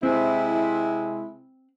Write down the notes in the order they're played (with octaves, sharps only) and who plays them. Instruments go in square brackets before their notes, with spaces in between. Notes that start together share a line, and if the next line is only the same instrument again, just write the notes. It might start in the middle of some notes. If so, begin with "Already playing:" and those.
[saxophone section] C3 G#3 E4 [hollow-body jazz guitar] C4